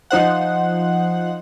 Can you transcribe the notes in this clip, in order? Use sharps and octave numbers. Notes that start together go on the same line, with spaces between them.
F3 D#4 C5 F#5